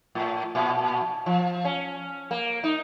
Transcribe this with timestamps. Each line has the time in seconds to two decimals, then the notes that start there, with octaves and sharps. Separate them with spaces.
0.15 A2
0.55 A#2
1.26 F3
1.65 C#4
2.31 A#3
2.64 D#4